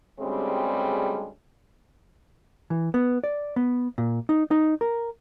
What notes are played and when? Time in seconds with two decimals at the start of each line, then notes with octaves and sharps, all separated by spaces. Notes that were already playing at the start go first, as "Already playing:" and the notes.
0.20 D2 G2 C#3 G3 G#3 C4
2.70 E3
2.94 B3
3.24 D5
3.56 B3
3.98 A#2
4.29 D#4
4.51 D#4
4.81 A#4